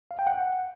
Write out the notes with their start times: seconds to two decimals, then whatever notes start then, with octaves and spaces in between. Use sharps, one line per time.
0.11 F5
0.19 G5
0.27 F#5